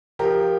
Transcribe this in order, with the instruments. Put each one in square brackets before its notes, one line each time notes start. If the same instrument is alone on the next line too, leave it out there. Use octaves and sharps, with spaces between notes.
[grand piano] F3 G4 A#4